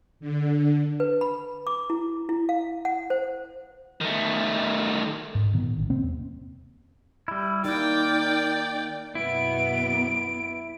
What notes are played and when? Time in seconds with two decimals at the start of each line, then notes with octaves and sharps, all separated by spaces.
0.20 D3
1.00 B4
1.21 B5
1.67 D6
1.90 E4
2.29 E4
2.49 F5
2.85 F#5
3.10 C5
4.01 D#3 A3
5.35 G#2
5.53 A#2 D#3 B3
5.76 A1
5.90 C3 A#3 C4 C#4
6.03 E2
7.28 G3 E4
7.64 D#3 A#3 D#4 D5 G5
9.15 F#2 B2 B3 E4 D7